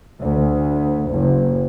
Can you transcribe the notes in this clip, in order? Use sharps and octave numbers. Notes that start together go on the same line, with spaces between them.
D2
F#1